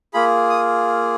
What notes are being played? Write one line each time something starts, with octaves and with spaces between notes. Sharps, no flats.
A#3 F4 G#4 B5
D#6